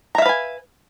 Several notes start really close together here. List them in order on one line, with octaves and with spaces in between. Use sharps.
A#5 E5 F5 B4 G#5